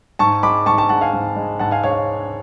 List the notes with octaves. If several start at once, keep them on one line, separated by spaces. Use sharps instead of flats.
G#2 A5 C#6
G#3 B5 D6
G#2 A5 C#6
A5 C#6
G#3 F#5 A5
F5 G#5
G#2
G#3
G#2 F#5 A5
F5 G#5
G#3 C#5 F5